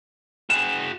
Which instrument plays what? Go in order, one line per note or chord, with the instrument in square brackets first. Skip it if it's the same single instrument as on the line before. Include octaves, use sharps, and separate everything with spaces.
[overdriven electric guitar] F#4 G#4 [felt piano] E7